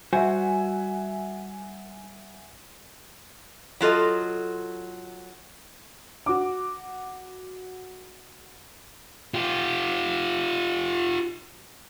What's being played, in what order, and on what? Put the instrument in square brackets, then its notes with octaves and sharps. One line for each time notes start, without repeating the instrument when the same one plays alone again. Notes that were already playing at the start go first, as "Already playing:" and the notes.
[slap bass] G3 [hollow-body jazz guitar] F#4 C5 [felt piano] E5 F#5 G#5
[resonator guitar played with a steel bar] F#3 F4 A4 D#5
[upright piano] F#4 D6
[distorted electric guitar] F4 G4